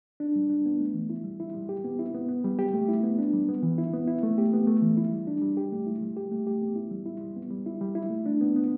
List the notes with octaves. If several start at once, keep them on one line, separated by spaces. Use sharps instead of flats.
D4
G3
D4
B3
A3
E3
E4
G3
E4
G3
G4
B3
E4
B3
B3
G3
G4
A3
E4
B3
D4
G3
B3
E3
E4
B3
E4
A3
G4
B3
A3
E3
E4
G3
D4
G3
G4
A3
E4
G3
G4
A3
G4
B3
E4
G3
E4
G3
B3
G3
E4
G3
E4
A3
D4
B3
B3